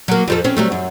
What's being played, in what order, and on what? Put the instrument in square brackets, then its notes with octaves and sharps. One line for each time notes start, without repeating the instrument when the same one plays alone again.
[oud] F#3 A#3
F2 F3 A4
C4 C#4
F#3 G3 A3
F#2